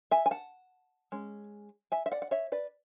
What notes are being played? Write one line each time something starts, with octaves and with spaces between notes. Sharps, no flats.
E5 G#5
G#5
F#5 A5
G#3 C#4
E5 G#5
E5
D5 F#5
F#5
C#5 E5
B4 D5